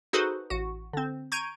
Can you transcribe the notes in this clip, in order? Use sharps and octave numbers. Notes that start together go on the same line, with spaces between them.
D#4 F#4 G#4 A4 B4 C5
A1 F#4
D3 C4
A#5 C#6 G6 G#6 D7 D#7